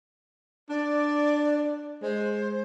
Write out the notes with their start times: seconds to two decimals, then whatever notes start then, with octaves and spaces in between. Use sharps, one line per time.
0.69 D4 D5
2.02 G#3 C5